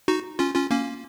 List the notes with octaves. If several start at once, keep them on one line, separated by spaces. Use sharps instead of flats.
D#4 F#4
C#4 F4
C#4 F4
A#3 C#4